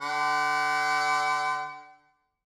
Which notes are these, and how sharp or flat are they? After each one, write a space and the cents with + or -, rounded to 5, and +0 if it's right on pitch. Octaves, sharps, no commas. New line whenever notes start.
D3 +0 F#5 +45